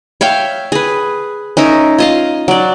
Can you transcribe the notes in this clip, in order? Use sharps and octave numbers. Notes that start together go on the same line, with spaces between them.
C#5 E5 F5 G5
G#4 B4
C#4 D#4 A#4 E5
F4 D#5 F5
F#3 D5